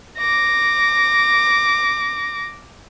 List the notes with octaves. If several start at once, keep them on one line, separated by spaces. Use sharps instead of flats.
D6 A#6